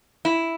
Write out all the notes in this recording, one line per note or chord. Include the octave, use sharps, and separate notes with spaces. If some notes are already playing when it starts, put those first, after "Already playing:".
E4